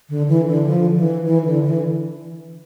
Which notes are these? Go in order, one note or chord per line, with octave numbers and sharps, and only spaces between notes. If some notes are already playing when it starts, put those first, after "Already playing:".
D3
E3
D3
F3
E3
E3
D3
E3